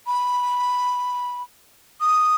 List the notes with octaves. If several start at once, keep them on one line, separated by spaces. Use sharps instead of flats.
B5
D#6